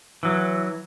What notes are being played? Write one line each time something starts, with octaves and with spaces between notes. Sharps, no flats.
E3 F#3